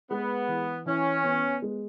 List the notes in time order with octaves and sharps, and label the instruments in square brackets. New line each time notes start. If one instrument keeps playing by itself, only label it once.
[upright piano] G#3 [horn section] B3
[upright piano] E3
[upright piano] E3 [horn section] C#4
[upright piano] B3
G#3